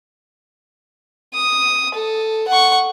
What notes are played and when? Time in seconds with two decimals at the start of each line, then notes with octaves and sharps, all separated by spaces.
1.34 D#6
1.95 A4
2.48 F#5 C#6